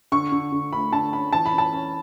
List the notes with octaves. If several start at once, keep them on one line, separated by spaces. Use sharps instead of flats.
D3 C#6
D3
D3
A3 B5
D3 A5
C#4 B5
E3 A5
B5
C#4
A5
C#4